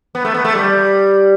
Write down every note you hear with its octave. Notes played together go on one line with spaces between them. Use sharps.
B3
A3
B3
A3
G3